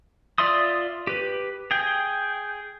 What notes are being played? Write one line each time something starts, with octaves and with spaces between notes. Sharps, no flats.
F4 D5 E5 C6 D#6
G4 B4
G#4 G5